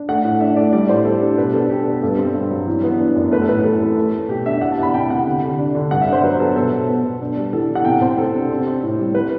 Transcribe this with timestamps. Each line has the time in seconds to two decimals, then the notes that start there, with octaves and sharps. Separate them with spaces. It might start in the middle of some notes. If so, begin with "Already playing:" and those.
Already playing: D4
0.09 A3 F#5
0.24 A2
0.40 D4 E5
0.56 A3 D5
0.73 G3 D5
0.89 A2 C5
1.05 G3 A4
1.21 D4
1.38 B2 B4
1.53 D4 A4
1.70 D4 G4
1.86 B3
2.03 G2 A4
2.18 C4
2.35 G2
2.51 F#3
2.67 E3
2.84 B3
2.99 D4
3.16 F#2
3.31 A3 B4
3.42 A4
3.49 A2 B4
3.64 E3 A4
3.81 C4
3.97 A3
4.14 A3
4.29 B2 G4
4.46 D4 E5
4.61 E2 F#5
4.72 A5
4.78 E2
4.83 B5
4.93 C3 G5
5.10 C3 F#5
5.26 D3
5.43 D3
5.58 D4
5.75 D3
5.91 G2 F#5
6.02 E5
6.07 D4
6.13 C5
6.24 F#3 B4
6.39 B3 A4
6.56 B2 A4
6.72 B2
6.88 B3
7.04 B2
7.21 D4
7.36 G3
7.53 E3 A4
7.70 E3
7.75 F#5
7.85 C3 G5
8.01 C3 C5
8.18 C3 A4
8.34 D4
8.50 C4
8.67 C4
8.83 A2
8.99 G3
9.15 B4